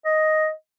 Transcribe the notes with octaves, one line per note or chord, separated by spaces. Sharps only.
D#5